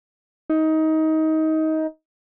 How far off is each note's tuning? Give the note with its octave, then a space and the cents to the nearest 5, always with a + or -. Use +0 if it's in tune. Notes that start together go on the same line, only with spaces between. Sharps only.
D#4 +20